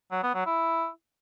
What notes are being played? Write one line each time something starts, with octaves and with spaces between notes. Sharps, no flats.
F#3
B3
F#3
E4